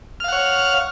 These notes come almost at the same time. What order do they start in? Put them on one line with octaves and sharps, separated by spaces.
F6 F5 F#5 C#5